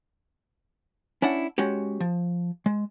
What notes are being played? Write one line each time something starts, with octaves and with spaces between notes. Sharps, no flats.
C#4 D4 E4 F#5
G#3 C#4 F#4 G4
F3
G#3